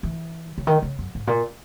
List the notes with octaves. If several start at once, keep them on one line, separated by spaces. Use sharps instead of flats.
E3
C#3
D#3
C#3
F#2
G#2
A#2